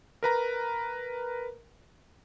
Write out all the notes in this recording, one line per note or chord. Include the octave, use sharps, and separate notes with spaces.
A#4 B4 A#5